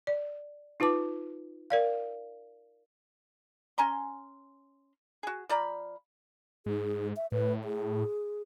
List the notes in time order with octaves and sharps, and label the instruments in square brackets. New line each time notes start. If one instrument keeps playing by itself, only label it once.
[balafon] D5
D#4 F4 B4 A5 D6
A#4 D5 F5
[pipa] C#4 G#5 A#5 C6
F#4 G#4
F3 D5 A#5 B5
[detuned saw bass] G#2 [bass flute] G#4
[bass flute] E5
[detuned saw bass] A2 [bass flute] B4
[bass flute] G#4